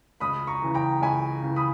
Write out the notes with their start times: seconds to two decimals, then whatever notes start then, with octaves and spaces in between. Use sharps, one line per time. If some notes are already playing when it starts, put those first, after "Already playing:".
0.20 C#2 B5 D#6
0.47 A#5 C#6
0.62 C#3 E3
0.74 G5 A#5
1.02 C#2 G#5 B5
1.43 C#3 E3
1.56 B5 D#6